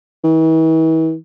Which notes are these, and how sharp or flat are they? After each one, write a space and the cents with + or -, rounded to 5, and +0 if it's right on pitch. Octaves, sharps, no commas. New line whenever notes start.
E3 -40